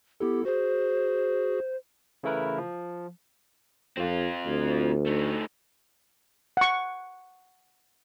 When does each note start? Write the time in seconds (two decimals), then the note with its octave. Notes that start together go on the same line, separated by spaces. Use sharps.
0.20 B3 E4 G4 A4
0.45 F#4 G#4 C5
2.23 C#3 E3 A3 E4 A#4 B4
2.58 F3
3.97 F2 C4 F4
4.47 D2
5.07 A3 D#4
6.57 F#5 C#6